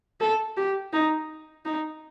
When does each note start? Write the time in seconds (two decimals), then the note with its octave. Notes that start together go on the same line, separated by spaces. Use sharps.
0.21 A4
0.57 G4
0.93 D#4
1.65 D#4